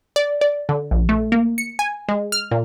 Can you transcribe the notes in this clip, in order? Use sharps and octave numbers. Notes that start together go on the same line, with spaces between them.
D5
D5
D3
A#1
A3
A#3
C#7
G#5
G#3
F6
A#2